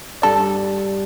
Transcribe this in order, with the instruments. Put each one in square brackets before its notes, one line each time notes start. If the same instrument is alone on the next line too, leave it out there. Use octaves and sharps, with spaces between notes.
[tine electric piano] G2 G3 D4 G4 D5 [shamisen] A4